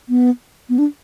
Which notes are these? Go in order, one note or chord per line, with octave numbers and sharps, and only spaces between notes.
B3
B3
D4